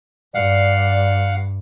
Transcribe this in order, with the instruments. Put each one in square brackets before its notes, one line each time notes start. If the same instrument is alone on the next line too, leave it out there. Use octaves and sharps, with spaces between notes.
[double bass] G2 [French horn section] D5 [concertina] F5 F#5